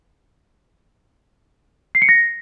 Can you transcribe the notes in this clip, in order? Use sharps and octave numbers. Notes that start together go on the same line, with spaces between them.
C7
C#7
A#6